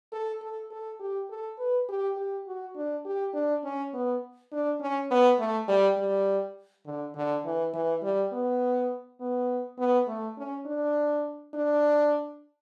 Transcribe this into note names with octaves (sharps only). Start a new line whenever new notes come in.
A4
A4
A4
G4
A4
B4
G4
G4
F#4
D4
G4
D4
C#4
B3
D4
C#4
B3
A3
G3
G3
D3
D3
E3
E3
G3
B3
B3
B3
A3
C#4
D4
D4